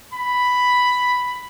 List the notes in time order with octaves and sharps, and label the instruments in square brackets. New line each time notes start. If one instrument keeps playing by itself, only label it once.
[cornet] B5